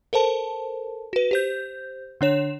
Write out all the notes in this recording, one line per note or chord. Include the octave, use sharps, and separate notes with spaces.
A4 A#4 C5 A5
F#4 B4
G4 C5 G6
D3 D4 C#5 E7